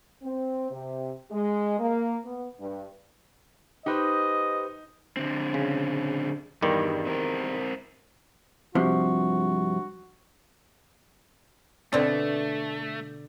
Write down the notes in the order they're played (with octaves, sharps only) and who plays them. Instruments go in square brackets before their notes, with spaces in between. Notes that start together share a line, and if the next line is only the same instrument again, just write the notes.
[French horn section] C4
C3
G#3
A#3
B3
G2
[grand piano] D#4 [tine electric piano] G4 B4 C5 [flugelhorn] D#5
[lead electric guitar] D3 C4
[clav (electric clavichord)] C#3
[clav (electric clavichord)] E2 D#3 G3 [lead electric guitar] G2
[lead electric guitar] C4 A#4
[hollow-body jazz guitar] G2 C3 F3 [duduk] F#4
[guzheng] B2 D3 [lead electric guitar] A3 [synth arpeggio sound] C4 [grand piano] D5